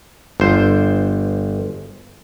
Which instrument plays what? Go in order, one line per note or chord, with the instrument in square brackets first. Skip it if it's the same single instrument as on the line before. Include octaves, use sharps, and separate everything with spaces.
[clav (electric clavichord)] G1 C5